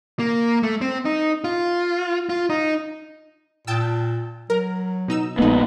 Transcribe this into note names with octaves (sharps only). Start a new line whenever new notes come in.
A#3
A3
C4
D#4
F4
F4
D#4
A#2 G5 A5 E6
F#3 A#4
B2 D#4 E6
A#1 G#3 A3 B3 D#4